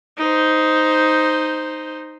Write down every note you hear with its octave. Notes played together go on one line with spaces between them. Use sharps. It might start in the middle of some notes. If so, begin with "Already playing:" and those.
D#4 C5